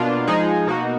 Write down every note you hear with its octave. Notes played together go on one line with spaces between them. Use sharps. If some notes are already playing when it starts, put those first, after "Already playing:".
Already playing: B2 A#3 D4 F4
F3 G#3 D#4 G#4
B2 A#3 D#4 F#4